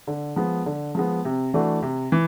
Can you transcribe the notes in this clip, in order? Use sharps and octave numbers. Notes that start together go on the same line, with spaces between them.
D3
F3 G#3 B3
D3
F3 G#3 B3
C3
E3 A3 D4 F#4
C3
E3